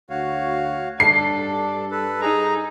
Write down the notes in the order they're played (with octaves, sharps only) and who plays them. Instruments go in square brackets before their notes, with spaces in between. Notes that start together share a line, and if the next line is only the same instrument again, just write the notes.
[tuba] D2 [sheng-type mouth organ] F#4 C#5 F5
[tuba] G2 [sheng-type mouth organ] D4 [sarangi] A4 [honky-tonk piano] C7
[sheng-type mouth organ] A4 B4
[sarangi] D#4 [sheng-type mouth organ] G#4 A#5